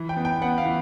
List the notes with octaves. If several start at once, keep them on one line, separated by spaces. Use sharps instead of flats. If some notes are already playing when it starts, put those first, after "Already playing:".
Already playing: E3
G5
B3
G5
B3 F#5
F5
E3